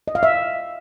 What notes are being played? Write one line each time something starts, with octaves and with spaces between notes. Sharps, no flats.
D#5
F5
E5